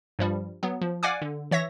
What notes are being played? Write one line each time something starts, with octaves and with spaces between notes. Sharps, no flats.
G2 F3 G3
F#3 B3
F3
D5 F5 F#5 G#5 D6
D3
E3 C#5 E5 A#6